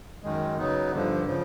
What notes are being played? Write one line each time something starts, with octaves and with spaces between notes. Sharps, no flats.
F#2 D#3 G#3
C#3 F#3 B3 D#4
G2 D3 F3
C#3 F3